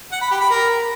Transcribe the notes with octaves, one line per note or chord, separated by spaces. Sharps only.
F#5
B5
G4
B5
A#4